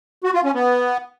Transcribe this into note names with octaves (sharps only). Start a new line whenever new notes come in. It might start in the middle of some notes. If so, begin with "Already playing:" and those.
F#4
F4
C#4
B3